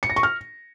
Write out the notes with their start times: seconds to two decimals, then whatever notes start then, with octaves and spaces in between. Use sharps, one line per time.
0.03 C#7
0.10 A#6
0.16 C#6
0.23 F6